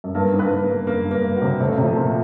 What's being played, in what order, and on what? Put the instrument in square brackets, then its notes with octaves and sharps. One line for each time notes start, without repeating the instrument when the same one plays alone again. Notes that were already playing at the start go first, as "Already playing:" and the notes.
[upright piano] F#2
[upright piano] G2 [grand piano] A#3
[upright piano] G#2
[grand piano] B4
[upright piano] G2
G#2
[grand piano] A#3
[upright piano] G2
[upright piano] F#2 [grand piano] A#3
[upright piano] G2
[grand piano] A#3
[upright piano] G2
[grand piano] F#4
[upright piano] C3
[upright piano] C3 [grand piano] A3
[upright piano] C#3
C3
[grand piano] F3
[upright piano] A#2